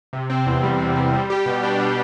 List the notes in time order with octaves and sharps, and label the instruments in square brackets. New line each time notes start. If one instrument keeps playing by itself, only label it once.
[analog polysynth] C3
C4
E2
G3
C3
C4
G3
G4
B2
D4
G3